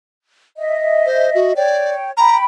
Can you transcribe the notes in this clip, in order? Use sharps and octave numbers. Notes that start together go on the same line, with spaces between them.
D#5 E5
C5
F#4
C#5 D5 G5
G5 A#5 B5